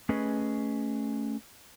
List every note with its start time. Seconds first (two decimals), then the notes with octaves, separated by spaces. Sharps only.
0.09 A3 C#4 G#4 B4 D#5